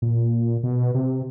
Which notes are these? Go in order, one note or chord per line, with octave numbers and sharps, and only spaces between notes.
A#2
B2
C3